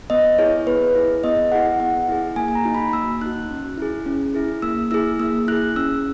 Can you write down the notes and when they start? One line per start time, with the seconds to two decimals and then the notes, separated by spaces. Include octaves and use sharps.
0.10 B3 D#5
0.38 E4 G#4 C#5
0.67 B3 B4
0.95 E4 G#4
1.24 B3 D#5
1.52 E4 G#4 F#5
1.80 B3 F#5
2.09 E4 G#4
2.36 A#3 G#5
2.48 G#5
2.55 A#5
2.65 D#4 F#4
2.75 B5
2.93 A#3 E6
3.21 D#4 F#4 F#6
3.50 C#4
3.78 E4 G#4
4.06 C#4
4.35 E4 G#4
4.62 A#3 E6
4.91 E4 G#4 E6
5.19 A#3 E6
5.48 E4 G#4 F#6
5.76 C#4 E6